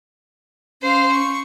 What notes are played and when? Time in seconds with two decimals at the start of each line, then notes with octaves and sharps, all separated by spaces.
0.82 C#4 C5 F5
1.12 C#6